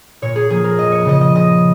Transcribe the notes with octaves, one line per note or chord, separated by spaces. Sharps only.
A#2 C#5
G#4
F3 A#3 G#4
A#4
F2 D#5
C#5
C#3 F3 D#5
D#5
C#3 D#5